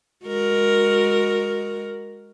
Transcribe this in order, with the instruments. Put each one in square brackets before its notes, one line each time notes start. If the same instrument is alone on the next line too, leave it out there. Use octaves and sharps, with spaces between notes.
[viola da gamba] G#3 F#4 A#4